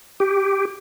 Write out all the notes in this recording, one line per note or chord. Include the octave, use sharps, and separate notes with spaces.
G4